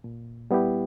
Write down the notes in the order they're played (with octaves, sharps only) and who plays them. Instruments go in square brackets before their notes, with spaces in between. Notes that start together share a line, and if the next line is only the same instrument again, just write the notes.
[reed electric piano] A#2
G3 B3 E4 G4